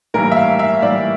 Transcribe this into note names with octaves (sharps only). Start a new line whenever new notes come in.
A2 E3 G3 A#3 A#4
E5
F5
E5
A2 E3 G3 A#3 D5